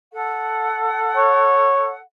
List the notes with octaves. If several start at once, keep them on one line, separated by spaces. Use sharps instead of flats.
A4 F#5
C#5